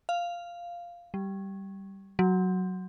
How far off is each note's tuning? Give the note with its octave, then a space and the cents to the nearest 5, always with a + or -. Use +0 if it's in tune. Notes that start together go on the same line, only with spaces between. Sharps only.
F5 -5
G3 -10
F#3 +0